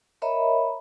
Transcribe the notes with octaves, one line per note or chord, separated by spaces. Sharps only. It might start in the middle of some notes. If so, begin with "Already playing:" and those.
A#4 C#5 D#5 E5 A#5 B5